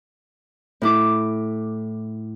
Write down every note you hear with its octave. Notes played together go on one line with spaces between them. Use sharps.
A2 E4 D6